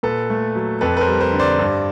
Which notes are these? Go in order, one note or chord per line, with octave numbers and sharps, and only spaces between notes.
A#2 A4 B4
A3
F#3
F2 A4 B4
B4
A#4 C5
G3
A#4 C5
D3
C5 D5
G2